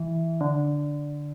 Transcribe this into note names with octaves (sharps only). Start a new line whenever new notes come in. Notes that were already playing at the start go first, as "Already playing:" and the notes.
Already playing: E3
D3